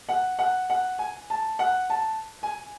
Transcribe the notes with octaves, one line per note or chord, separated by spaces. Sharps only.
F#5
F#5
F#5
G#5
A5
F#5
A5
G#5